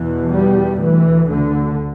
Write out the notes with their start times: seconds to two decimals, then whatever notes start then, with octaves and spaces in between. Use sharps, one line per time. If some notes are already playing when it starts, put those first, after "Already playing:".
Already playing: E2 B2 E3
0.32 G3
0.81 D2 E3
1.30 D3